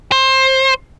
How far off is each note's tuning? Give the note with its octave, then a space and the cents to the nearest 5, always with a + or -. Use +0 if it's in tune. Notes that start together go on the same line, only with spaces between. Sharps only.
C5 +20